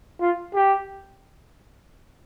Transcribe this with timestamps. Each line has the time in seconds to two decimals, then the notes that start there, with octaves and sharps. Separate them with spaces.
0.20 F4
0.55 G4